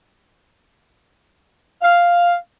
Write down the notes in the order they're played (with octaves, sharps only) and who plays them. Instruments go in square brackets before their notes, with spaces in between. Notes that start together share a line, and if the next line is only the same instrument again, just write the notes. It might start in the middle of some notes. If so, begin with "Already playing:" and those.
[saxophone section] F5